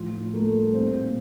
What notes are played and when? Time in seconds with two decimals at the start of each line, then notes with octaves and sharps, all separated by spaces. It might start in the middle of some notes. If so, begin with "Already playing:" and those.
Already playing: A2 F3 F4
0.13 A2
0.33 A3 A#3 A4
0.54 G3
0.73 A#2 C4 C5
0.94 A#2